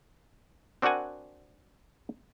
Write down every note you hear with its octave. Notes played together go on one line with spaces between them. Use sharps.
C4 D4 F#4 A#4 F#5 G#5